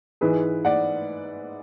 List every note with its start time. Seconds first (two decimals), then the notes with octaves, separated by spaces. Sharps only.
0.21 G#2 E3 G#4 B4
0.65 D5 F#5